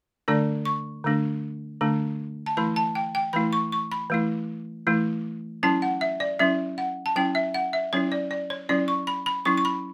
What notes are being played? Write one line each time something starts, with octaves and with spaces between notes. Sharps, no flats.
D3 A3 D4 D5
C#6
D3 A3 D4
D3 A3 D4
A5
E3 A3 E4 B5
A5
G5
G5
E3 A3 E4 B5
C#6
C#6
B5
E3 A3 E4
E3 A3 E4
F#3 C#4 E4 A5
F#5
E5
D5
F#3 C#4 E4 E5
F#5
A5
F#3 C#4 E4 G5
E5
F#5
E5
F#3 C#4 E4 C#5
D5
D5
C#5
F#3 C#4 E4 D5
C#6
B5
B5
F#3 C#4 E4 C#6
C#6
B5